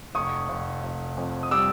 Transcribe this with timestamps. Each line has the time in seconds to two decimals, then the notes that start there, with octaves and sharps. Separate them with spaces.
0.15 F1 C#6 D#6
0.49 F1
0.83 F1
1.17 F2
1.43 D#6
1.51 G3 D6 E6